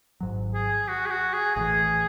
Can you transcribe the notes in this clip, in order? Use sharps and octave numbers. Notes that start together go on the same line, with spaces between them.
G#1 G#2 F#3
G#4
F#4
G#4
F#4
G#4
A1 A2 E3 G#4